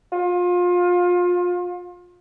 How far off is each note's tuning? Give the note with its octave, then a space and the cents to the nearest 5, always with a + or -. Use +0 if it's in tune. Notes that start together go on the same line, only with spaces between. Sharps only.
F4 +30